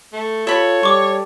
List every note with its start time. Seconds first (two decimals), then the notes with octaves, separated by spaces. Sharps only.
0.13 A3
0.47 F4 A4 C#5 B5
0.83 G3 C#6 D6